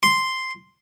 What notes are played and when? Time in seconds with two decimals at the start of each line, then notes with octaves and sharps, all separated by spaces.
0.03 C6